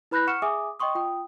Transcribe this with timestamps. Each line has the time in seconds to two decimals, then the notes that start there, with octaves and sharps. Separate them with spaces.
0.11 E4 B4 B5 F#6 G6 A#6
0.27 F#5 C#6 F6 C#7 E7
0.42 G#4 E5 G#5 D6 D#6
0.80 D#5 G5 C6 C#6 D#6
0.95 F4 G5 D#6